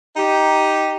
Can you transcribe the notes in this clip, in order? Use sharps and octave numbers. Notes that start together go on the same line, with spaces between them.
D#4 G4